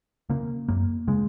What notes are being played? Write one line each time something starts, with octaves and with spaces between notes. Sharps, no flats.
C#3 A#3
F#2 A#3
C#3 G#3